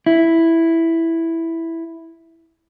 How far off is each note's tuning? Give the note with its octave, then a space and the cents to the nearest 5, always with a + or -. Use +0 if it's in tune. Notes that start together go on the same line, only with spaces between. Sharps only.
E4 +0